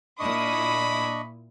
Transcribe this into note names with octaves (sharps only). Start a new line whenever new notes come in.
A#2 D4 E4 D#5 B5 C#6 D#6